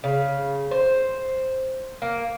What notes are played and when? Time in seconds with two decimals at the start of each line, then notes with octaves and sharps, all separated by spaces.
0.04 C#3
0.71 C5
2.02 A#3